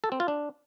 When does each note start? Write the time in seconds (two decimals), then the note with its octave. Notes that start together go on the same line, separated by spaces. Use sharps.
0.04 A4
0.12 C4
0.20 F4
0.28 D4